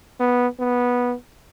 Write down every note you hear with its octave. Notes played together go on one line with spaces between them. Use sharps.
B3
B3